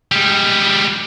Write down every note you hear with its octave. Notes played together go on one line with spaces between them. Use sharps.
G3 G#3